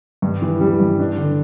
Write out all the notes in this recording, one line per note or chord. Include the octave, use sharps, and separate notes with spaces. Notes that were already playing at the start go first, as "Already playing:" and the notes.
G2
E3
G3
G2
D4
D3